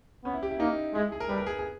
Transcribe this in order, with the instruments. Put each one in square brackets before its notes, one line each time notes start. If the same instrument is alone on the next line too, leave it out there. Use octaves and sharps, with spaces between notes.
[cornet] B3 [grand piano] C#4
[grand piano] E4
G4
E4
[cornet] A#3 [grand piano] D#4
[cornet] G#3 [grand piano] E4
[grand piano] G#4
A#4
[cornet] G3 [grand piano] B4
[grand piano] A#4
G#4
G#4